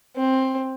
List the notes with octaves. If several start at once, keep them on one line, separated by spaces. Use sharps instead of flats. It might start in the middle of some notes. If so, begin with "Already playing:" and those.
C4